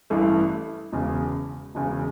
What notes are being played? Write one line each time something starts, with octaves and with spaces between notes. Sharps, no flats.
A1 G2 E3 A3
E1 E2 C#3
E1 E2 C#3